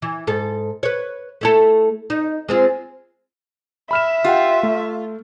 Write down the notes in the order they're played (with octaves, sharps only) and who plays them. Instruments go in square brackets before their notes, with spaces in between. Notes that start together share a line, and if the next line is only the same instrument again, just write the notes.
[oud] E3
G#2 A4
B4 C#5
A3 E4 A4
D#4
G#3 C4 F4
[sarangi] E5 [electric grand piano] B5 F6 E7
[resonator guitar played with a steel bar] F4 [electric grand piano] G4 F#5 G5
[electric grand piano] A3